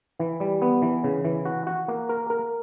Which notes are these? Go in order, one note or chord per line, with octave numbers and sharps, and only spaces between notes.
E3
G3
B3
E3
C#3
E3
F#4
F#4
A#3
A#4
A#4